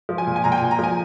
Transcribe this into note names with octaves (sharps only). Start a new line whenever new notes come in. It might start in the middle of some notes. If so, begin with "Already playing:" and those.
F3
G#5
A#2
G#5
A#2 A#5
G5
A#2 G#5
A#5
F3 G#5